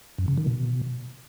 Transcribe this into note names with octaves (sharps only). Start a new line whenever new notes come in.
F#2
C#3
D#3
B2